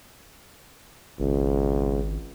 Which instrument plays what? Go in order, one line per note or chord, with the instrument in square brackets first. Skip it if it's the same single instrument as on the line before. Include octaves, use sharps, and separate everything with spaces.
[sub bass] G#1 [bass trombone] C#2